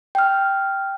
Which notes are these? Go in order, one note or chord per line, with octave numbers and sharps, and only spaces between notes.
G5 F6